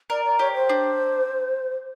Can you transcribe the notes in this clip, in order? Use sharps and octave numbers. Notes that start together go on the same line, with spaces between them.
A#4 D5
D5
G4 C#5
C5
D4